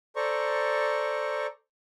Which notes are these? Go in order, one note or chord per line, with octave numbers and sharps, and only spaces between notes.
A4 C5 D5 A#5 C#6